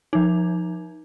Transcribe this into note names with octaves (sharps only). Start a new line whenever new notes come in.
F3 D#4